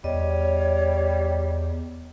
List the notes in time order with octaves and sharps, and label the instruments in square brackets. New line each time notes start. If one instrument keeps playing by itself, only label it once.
[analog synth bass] E2 [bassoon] G3 [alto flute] C#5 [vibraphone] D#5